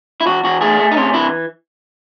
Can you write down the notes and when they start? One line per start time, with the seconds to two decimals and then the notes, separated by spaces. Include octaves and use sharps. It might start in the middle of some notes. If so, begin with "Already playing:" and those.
0.21 E4
0.27 E2 F#4
0.44 E2 F#4
0.61 A3 G#4
0.79 A3
0.91 D#4
0.97 C3 C#4
1.14 E3 E4